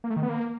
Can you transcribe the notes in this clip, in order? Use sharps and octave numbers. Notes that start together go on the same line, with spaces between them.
A#3
A3
D#3
B3
A#3